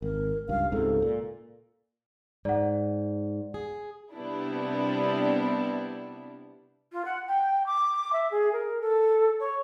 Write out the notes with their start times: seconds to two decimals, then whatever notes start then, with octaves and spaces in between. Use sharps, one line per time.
0.02 G#1 A#4
0.49 C#2 G2 F5
0.72 C#2 G#2 C3 A4
1.02 A#2
2.45 G#2 D5 F#5
3.54 G#4
4.12 C3 G3 B3 D4 E4
6.92 F4
7.05 F#5
7.27 G5
7.66 D6
8.12 E5
8.31 G#4
8.53 A#4
8.81 A4
9.40 C#5